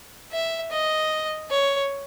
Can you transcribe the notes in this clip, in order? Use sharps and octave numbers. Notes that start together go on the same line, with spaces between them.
E5
D#5
C#5